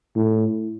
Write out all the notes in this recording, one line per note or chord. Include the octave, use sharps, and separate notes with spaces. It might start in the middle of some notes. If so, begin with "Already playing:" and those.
A2